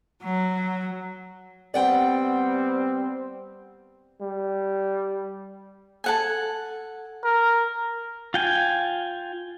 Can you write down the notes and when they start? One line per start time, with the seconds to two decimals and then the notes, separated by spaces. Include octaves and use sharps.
0.24 F#3
1.74 G3 B3 C4 D5 F#5 G5
4.21 G3
6.04 A4 F#5 G#5
7.24 A#4
8.34 F4 G5 G#5